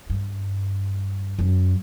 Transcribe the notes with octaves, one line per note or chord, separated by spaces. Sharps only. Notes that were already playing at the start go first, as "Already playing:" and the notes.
G2
F#2